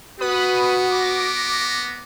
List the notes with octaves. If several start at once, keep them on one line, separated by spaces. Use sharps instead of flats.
B3 F#4 B4 B5 D#6
D6 A#6